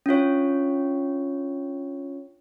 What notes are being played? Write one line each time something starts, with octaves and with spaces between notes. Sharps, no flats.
C#4 D4 F4 C#5